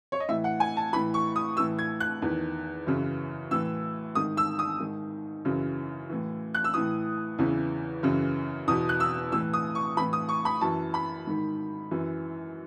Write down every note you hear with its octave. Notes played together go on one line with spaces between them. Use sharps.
C#5
D#5
A2 E3 E5
F#5
G#5
A5
A2 E3 B5
C#6
D#6
A2 E3 E6
G#6
F#6
E2 D#3
F#2 C#3 E3
A2 E3 E6
G#2 D#3 D#6
E6
D#6
G#2 D#3
F#2 C#3 E3
A2 E3
F#6
E6
A2 E3 D#6
E2 C#3 E3
F#2 C#3 E3
E2 B2 D#6
F#6
E6
A2 E3 E6
D#6
C#6
A2 E3 B5
D#6
C#6
B5
F#2 E3 A5
B5
G#2 D#3
F#2 E3